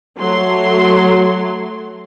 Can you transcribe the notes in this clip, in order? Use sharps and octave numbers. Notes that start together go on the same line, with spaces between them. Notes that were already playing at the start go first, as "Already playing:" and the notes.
F#3 A3 C6